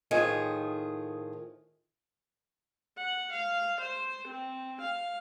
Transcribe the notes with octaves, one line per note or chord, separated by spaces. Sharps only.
A2 D#3 F3 G#4
F#5
F5
C5
C4
F5